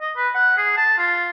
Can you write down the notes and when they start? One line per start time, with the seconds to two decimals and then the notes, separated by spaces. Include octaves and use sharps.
0.01 D#5
0.17 B4
0.35 F#5
0.58 G#4
0.77 A5
0.98 F4